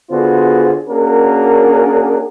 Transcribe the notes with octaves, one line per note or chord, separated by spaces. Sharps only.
D3 B3 F4 F#4 G#4 C5
A#3 C#4 D4 F#4 G#4 A#4